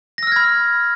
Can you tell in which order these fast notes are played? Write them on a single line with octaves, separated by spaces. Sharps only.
A#6 E6 F6 G#6 B5